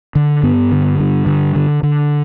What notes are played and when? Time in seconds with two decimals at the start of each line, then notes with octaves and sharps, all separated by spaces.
0.15 D3
0.43 G2 B3
0.72 D3
1.00 G2
1.27 D3
1.56 D3
1.83 D3